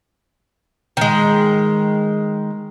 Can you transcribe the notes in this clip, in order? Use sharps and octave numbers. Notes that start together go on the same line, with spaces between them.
D#3 G#3